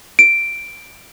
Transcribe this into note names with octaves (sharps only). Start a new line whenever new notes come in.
D7